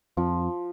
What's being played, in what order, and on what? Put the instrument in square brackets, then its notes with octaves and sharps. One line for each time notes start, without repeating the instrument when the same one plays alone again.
[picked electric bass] F2 [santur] F3